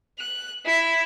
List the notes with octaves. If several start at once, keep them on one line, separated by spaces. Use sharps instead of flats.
F#6
E4